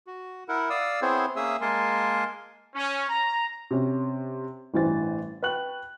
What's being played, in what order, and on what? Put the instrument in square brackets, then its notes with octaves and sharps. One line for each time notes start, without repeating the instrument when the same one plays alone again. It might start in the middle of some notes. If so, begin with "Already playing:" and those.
[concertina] F#4
E4 A#4 F#5
D5 F5 D#6 E6
B3 C4 E4 G#4 C5 C#5
A#3 C#4 G#4 E5 D#6 E6
G#3 A#3 A#4 G#5 A5 C6
[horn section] C#4
A#5
[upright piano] C3 C#4
A1 G2 E3 C5 A6
B4 G5 C#6 F#6 F#7